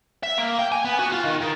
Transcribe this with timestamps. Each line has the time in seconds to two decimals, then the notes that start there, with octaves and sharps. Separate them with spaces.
0.23 E5
0.38 A#3
0.59 G5
0.72 G#5
0.85 B3
0.99 F#4
1.12 F4
1.24 D#3
1.41 D#3